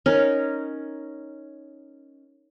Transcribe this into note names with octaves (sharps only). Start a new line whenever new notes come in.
C#4 D#4 A#4